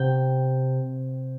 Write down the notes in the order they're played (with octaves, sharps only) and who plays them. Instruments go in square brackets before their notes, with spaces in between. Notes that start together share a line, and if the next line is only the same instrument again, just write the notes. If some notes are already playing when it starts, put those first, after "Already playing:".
Already playing: [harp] C3 G5